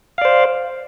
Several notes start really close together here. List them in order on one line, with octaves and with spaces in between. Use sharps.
F5 D5 C5